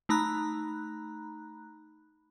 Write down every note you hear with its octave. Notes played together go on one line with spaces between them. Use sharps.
A3 D#4 A#5 B5 F#6